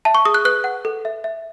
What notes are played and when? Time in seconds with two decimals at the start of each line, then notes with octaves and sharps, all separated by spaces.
0.05 E5 A5
0.15 C#6
0.25 G#4 D#6
0.34 F#6
0.45 B4 F#6
0.64 F#5
0.85 A4
1.05 E5
1.24 E5